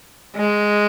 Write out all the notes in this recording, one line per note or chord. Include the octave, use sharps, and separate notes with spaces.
G#3